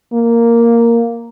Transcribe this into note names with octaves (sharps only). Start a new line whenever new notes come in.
A#3